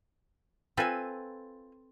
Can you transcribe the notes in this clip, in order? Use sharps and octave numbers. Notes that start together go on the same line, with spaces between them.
C4 F4 A4 B4 G#5